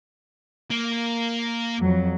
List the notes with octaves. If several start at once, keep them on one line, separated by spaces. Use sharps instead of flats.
A#3
F2 F#3